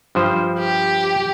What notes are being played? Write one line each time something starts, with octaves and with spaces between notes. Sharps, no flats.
G2 F3 C5
G4